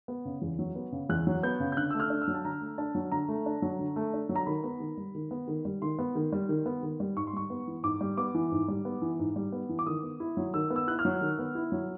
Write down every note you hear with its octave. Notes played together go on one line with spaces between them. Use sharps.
B3
C#3
E2
F#3
B3
C#3
E2 F#6
F#3
B3 G6
C#3
G6
D3 F#6
A3 E6
F6
D4
E6
F#3
A5
D3 A#5
A3
D4 A5
F#3
D3 A#5
A3
D4
F#3
D3
A3
D4
F#3
A#5
D#3 B5
B3
D#3
G3
D#3
B3
D#3
G3
D#3 C6
B3
D#3
G3
D#3
B3
D#3
G3
G#2 C#6
C6
G3 C#6
B3
E3
G#2 D6
G3
B3 D6
E3
G#2
G3
B3
E3
G#2
G3
B3
E3
D6
D#3 D#6
B3
E4
F#3
D#3 E6
B3
E6
E4 F#6
F6
F#3
D#3
B3
E4
F#3